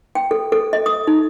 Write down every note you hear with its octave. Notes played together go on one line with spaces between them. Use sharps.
G5
A4
A4
D#5
D#6
D#4